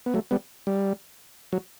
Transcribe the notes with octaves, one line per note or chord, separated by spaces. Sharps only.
B3
F#3 A3
G3 B3
G3
F#3